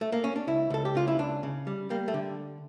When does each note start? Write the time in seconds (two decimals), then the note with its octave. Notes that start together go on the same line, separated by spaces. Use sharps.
0.01 A3
0.12 A#3
0.24 C#4
0.36 D4
0.47 C#2 E4
0.70 C#2 A4
0.85 G4
0.95 C#3 F4
1.08 E4
1.19 C#2 D4
1.43 C#3
1.67 G3
1.90 G3 A#3
2.08 A3
2.14 D3